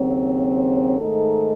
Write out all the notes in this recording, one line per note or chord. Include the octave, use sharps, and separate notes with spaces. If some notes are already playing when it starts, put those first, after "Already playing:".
Already playing: D#2 C#3 F#3 C4
G#2 D#3 A3 D#4 A4